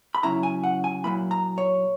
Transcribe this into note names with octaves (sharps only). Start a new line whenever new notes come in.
B5
C#3 F#3 C#4 E4 A#5
G#5
F#5
G#5
A#2 F#3 A#3 E4 B5
A#5
C#5